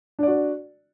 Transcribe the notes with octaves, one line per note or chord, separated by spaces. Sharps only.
D4 F#4 D5